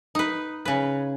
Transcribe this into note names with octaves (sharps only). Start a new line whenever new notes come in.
D#4 B4
C#3 B4